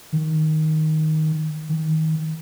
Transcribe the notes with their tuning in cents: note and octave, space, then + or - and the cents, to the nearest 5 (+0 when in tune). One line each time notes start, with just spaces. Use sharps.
D#3 +5
D#3 +25